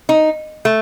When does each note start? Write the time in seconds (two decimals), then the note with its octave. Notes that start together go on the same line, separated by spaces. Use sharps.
0.09 D#4
0.65 A3